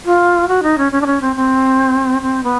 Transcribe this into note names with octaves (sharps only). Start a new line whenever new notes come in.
F4
F#4
D#4
C#4
C#4
D4
C#4
C4
C4
C4
B3